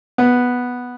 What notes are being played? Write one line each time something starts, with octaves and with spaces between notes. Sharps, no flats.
B3